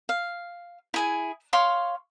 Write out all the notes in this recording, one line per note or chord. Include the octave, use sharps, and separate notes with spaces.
F5
E4 G#4 G#5
C#5 F5 C6 D6